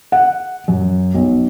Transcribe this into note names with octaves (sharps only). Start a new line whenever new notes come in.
F#5
F#2
B1